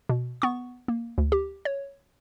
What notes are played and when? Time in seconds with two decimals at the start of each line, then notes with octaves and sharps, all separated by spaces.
0.09 B2
0.42 B3 C#6
0.88 A#3
1.18 D2
1.32 G4
1.65 C#5